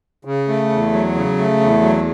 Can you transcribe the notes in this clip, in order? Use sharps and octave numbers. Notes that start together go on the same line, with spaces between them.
C#3
A3
E2
F#3
C#3
A3
E2
F#3